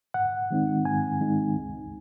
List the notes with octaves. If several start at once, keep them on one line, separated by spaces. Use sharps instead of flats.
G#2 F#5
D#3 G#3 C4 D#4
G#2 G#5
D#3 G#3 C4 D#4
C#2